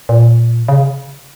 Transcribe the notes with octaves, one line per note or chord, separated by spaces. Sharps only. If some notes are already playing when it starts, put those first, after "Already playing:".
A#2
C#3